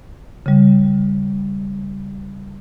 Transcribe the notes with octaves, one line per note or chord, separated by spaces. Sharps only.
C#3 G3